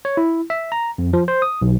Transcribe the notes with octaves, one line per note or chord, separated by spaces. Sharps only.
C#5
E4
E5
A#5
F2
F3
C5
D#6
B1